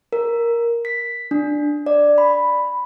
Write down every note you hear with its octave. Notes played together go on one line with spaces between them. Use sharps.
A#4
B6
D4
D5
B5